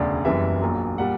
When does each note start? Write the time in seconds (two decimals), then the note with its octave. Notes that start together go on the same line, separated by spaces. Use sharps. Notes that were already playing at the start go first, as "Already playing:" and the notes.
Already playing: E1 D2 C#3 D5
0.24 F#1 F#2 E3 G3 E5
0.61 A#1 A#2 F#3
0.98 A#2 G3 F#5